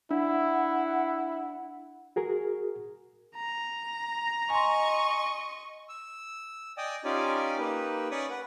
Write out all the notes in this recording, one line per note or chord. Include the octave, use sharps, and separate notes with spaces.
D4 E4 F#5
F#4 G#4 A#4
A#5
D#5 G#5 C6 C#6
E6
D5 D#5 G5 G#5 D#6
C#4 D#4 F4 G4 D5 G#5
A#3 D#4 G4 B4
C#4 C#5 D5 B5 C#6 D#6
B4 F#5